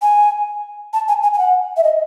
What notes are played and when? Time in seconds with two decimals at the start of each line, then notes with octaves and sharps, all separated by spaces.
0.02 G#5
0.93 A5
1.08 G#5
1.23 G#5
1.33 G#5
1.38 F#5
1.77 E5
1.83 D#5